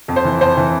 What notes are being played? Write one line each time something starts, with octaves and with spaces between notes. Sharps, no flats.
F2
C5
E3
F2 C5
E3